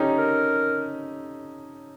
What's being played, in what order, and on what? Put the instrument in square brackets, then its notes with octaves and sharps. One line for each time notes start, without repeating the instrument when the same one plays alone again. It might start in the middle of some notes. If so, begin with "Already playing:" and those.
Already playing: [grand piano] C#4 D#4 G4 A4
[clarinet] A#4